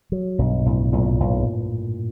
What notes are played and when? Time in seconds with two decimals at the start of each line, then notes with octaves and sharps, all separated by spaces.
0.12 F#3
0.39 B1 G2
0.59 A#2
0.66 B1 A2
0.93 B1 A#2
1.20 B1